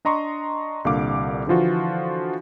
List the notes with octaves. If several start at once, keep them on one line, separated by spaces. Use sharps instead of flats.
D4 D#5 A#5 C6 C#6
C2 A#2 D3 F5 D6
D3 E3 F3 F4 F#4